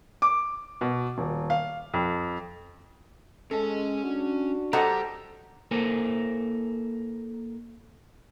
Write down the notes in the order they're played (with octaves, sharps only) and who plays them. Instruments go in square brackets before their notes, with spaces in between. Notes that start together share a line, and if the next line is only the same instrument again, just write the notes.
[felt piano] D6
B2
D#1
F5
F2
[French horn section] G#3 [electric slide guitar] C#4 G#5 [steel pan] A4
[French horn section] D4 F#4
[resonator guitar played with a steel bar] G3 C5 A#5 [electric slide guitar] G4 [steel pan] A4 D#5 F#5
[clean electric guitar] A#3 E4 A4 A#4 C5 G#5